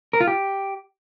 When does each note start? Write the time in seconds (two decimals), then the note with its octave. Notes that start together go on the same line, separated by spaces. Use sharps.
0.13 A#4
0.20 F4
0.27 G4